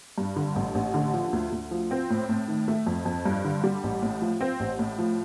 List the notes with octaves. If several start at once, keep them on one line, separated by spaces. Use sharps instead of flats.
G2
D3
A1
A1
D3
F3
D2
D2
F3
C4
A2
A2
D#3
A3
F2
F2
G2
D3
G3
A1
A2
F3
C4
A1
A2
F3